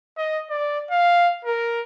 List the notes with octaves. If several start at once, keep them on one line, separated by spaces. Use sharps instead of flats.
D#5
D5
F5
A#4